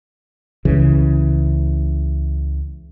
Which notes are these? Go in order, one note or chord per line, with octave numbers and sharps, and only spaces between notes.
C#2 C#3 E3